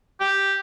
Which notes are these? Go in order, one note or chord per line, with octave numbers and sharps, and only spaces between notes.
G4